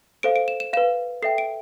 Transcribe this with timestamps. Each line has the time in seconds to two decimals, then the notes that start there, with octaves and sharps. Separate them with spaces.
0.23 A4 C5 F5 D7
0.36 D7
0.48 E7
0.60 E7
0.73 B4 F5 E7
1.22 A4 E5 G5 C7
1.38 D7